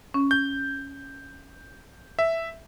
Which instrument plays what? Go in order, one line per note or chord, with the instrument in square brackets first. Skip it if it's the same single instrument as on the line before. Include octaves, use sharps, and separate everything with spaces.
[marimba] C#4
[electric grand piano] G6
E5